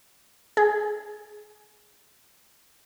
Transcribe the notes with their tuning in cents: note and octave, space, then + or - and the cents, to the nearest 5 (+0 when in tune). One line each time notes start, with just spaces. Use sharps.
G#4 +15